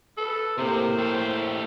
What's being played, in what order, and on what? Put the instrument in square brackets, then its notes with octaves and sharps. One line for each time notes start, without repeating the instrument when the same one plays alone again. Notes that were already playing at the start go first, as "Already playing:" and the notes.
[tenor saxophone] A4 [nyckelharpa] B4
[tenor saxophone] A2 [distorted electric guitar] C3 [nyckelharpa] A#3 [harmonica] C5
[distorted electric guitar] A3 G4